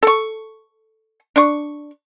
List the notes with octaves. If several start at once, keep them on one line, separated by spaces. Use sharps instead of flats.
A4 C#6
D4 C#6